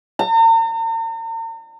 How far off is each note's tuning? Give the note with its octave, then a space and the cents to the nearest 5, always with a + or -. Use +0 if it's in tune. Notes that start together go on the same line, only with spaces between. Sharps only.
A#5 -45